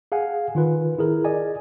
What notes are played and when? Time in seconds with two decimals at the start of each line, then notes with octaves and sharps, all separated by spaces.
0.12 G#4 F5 F#5 G#5
0.55 D#3 F4 B4
0.98 E4 G#4 A#4
1.24 G#4 D5 D#5 G#5